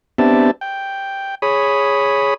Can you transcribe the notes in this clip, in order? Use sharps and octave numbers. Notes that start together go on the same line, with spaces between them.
B3 C4 D4 G4 E5 A5
G5
G#4 C#5 B5 D#6